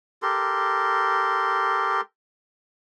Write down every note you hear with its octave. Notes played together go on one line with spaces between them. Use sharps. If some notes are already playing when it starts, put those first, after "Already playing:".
G4 A4 A#4 C6